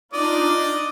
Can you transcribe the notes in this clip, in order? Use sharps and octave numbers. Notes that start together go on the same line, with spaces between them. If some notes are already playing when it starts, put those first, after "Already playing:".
D4 D#4 F4 D5 D#5 D6